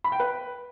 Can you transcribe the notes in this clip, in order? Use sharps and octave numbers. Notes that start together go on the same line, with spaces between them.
B5
G5
B4